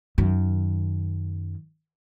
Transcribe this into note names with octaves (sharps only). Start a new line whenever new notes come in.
F#2 D#3